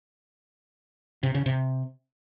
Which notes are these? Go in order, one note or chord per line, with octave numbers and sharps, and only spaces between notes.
C3
C#3
C3